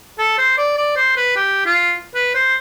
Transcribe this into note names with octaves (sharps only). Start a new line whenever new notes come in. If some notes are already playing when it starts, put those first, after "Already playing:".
A4
C5
D5
D5
C5
B4
G4
F4
B4
C5